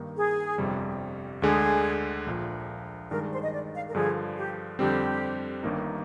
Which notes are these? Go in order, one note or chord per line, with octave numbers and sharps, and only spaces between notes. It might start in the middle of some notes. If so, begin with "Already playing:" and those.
Already playing: G2 D#3 A#3 D#4
G#4
G1 F2 C3 G3
D2 D3 G#3 G#4
A#1 A#2 F3
G2 D#3 G#3 D4 A#4
C5
D#5
D5
F5
A#4
G2 D3 F3 G#4
G4
F2 D3 G3 C4 G4
G1 G2 D#3 A#3 D#4